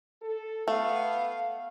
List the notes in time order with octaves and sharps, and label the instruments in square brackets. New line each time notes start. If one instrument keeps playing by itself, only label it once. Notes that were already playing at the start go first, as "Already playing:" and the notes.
[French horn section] A4
[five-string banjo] A3 [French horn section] B3 [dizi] F5